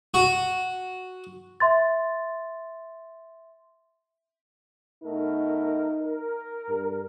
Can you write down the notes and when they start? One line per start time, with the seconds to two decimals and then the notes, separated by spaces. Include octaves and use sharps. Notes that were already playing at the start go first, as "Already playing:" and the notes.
0.14 F#4
1.60 E5 C6 A6
5.03 B2 A3 D#4 A#4
6.01 A#4
6.69 G2